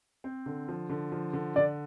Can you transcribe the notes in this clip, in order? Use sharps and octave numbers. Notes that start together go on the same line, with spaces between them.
C4
D3
F3
D3
F3
D3
D3 D5